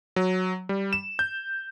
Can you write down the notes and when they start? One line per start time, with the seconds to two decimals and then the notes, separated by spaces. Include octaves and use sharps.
0.16 F#3
0.69 G3
0.93 E7
1.19 G6